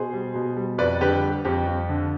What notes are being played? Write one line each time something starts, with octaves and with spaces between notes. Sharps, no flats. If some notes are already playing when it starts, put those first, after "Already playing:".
Already playing: B2 G#4 C5
G3
B2
G3
F2 B4 D5
D3 G4 B4
G3
F2 G4
F2
D3